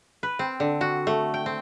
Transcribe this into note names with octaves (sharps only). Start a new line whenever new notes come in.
B4
C4
D3
F#4
A3
G5
C4